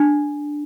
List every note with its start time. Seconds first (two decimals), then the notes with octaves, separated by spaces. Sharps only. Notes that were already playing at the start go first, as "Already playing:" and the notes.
Already playing: D4